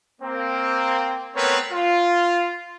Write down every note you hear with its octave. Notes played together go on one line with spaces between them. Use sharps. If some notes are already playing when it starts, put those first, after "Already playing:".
A#3 C4
A3 B3 C4 A#4 B4 C#5
F4